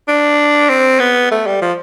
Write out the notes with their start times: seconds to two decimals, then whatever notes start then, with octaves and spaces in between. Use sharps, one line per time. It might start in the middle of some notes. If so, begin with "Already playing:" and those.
0.08 D4
0.70 C4
1.00 B3
1.31 A3
1.47 G3
1.62 F3